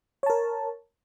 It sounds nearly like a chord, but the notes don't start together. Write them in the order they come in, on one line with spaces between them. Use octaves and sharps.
C#5 A5 A#4